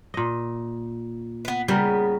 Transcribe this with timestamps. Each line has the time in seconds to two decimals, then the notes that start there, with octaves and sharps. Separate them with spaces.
0.14 A#2 D#5
1.45 B3 B4
1.68 C#3 G3 B3 A#4